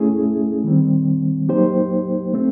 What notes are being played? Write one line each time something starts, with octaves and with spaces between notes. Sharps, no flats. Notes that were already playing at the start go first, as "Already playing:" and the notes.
Already playing: A3 C#4 E4 G#4
D#3 G3 C4
F#3 A#3 D#4 G4 C5
A3 C4